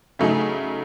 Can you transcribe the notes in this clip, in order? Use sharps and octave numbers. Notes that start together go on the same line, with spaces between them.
C#3 F#3 A3 D#4 G#4